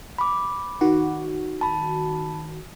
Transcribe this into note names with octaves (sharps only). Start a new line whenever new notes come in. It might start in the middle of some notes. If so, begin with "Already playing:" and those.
B5 D6
D#3 F#4
A5 B5